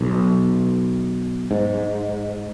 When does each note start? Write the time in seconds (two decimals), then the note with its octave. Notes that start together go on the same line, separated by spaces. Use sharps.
0.01 B1
1.51 G#2